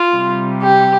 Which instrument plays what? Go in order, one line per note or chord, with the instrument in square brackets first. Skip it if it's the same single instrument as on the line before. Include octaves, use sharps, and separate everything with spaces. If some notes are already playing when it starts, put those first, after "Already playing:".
Already playing: [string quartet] F4
C3 G3
G4